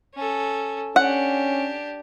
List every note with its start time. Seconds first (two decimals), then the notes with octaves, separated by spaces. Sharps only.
0.15 C#4 A4
0.96 C#4 D4 G4 F#5